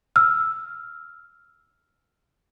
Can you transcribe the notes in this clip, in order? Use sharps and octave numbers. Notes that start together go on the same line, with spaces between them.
E6 F6